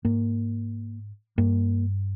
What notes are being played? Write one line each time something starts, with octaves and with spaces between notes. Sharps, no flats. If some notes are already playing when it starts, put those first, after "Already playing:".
G#2 A#3
G2 A#3